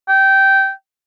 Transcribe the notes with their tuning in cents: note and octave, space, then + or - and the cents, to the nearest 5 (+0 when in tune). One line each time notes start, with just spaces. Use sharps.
G5 -15